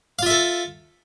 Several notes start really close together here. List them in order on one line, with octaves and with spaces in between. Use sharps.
F5 F4 E5 A4